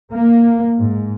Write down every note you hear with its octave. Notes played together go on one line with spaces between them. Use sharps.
A#3
G#2